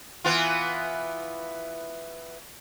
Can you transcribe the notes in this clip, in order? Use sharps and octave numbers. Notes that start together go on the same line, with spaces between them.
E3 B3 F4